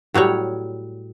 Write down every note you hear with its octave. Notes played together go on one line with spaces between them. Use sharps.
A2 F#3 G3 C#5